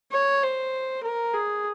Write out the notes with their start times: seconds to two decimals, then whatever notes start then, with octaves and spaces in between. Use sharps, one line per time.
0.12 C#5
0.43 C5
1.04 A#4
1.34 G#4